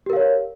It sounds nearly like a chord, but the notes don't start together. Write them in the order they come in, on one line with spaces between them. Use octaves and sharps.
G4 A#4 F5 C#5